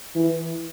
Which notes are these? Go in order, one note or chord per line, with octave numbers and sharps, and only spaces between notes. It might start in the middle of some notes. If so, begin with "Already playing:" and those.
E3